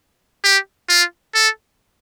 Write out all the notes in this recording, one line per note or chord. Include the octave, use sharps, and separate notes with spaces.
G4
F4
A4